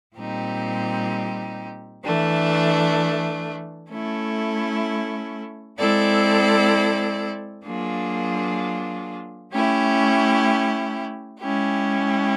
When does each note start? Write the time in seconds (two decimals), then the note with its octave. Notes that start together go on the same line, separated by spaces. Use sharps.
0.16 A#2 G3 C4 D#4 G4
2.04 E3 A3 D4
3.91 A3 C#4 E4 A4
5.78 G#3 C4 E4 A4 D5
7.65 F#3 A#3 D4 F4 G#4
9.53 A3 C#4 E4 G4
11.39 G#3 C#4 E4 G4